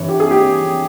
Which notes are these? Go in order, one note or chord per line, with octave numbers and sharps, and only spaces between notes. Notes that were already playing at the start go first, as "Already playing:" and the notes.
Already playing: G2 E3 C#5
G4
G#4
G4